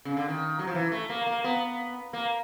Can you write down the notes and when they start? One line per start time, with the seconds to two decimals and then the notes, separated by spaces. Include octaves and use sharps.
0.05 C#3
0.17 D3
0.28 D#3
0.59 F#3
0.67 F3
0.75 E3
0.92 A3
1.10 A#3
1.27 A#3
1.44 B3
2.13 A#3